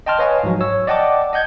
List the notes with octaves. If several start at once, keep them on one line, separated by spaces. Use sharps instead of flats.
D#5 G5 A5 C6 F6
B4 C#5 D#5 F5 G#5
G#2 F3 F#3
C#5 E6
D5 D#5 F#5 G5 A5 D6
D#5 F#5 G6 G#6